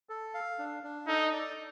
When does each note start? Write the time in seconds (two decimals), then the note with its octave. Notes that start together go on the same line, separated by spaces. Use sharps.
0.09 A4
0.34 F5
0.59 D4
0.83 D4
1.07 D#4 A4
1.33 D5